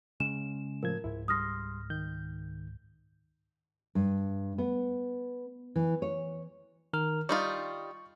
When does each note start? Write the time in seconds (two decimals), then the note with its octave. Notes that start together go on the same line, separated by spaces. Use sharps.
0.20 C#3 G#3 C#4 E7
0.83 A2 F3 A#4 G#6
1.04 C#2 G#2 E4
1.28 G3 C6 D#6 F6 A#6
1.90 D#3 G6
3.95 G2
4.58 B3
5.76 E3
6.02 C#5
6.93 D#3 A#4 F6
7.29 G3 D#4 F4 C#6